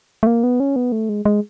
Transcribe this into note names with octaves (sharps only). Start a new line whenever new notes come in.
A3
A#3
B3
C#4
B3
A3
G#3
G#3